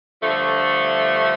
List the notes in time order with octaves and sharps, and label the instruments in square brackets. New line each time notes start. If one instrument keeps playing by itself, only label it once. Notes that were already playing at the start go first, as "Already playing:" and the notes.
[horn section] G2 D3 F3 A3